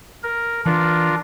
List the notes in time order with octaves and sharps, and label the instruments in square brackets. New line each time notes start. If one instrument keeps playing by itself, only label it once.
[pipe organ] A#4
[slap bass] E3 [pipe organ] D4 F4 A#4